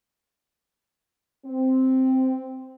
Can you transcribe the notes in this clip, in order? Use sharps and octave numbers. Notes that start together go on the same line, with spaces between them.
C4